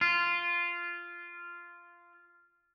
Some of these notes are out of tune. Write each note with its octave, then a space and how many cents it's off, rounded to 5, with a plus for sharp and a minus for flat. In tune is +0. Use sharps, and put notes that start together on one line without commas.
F4 -10